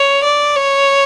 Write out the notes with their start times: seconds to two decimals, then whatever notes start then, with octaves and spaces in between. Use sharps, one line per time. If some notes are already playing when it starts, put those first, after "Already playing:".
Already playing: C#5
0.24 D5
0.56 C#5